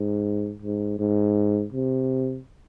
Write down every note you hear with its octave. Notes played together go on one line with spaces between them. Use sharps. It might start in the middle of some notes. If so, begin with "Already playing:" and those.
Already playing: G#2
G#2
G#2
C3